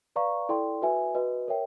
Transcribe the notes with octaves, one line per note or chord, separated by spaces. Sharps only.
B4 D5 F5 A#5 C#6
E4 A4 D5 G5 C6
F#4 B4 E5 G#5
F#4 B4 D#5
A#4 C#5 E5 G5